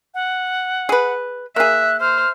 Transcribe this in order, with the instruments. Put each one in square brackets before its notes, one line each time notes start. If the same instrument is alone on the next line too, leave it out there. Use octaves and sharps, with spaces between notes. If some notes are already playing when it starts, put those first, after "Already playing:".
[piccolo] F#5
[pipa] G#4 B4
[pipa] A#3 G#4 [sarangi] E5 [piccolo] F#6
[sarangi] C5 [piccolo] F6